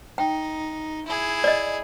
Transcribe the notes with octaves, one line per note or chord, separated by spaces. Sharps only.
D#4 G5
E4 G#4
D5 D#5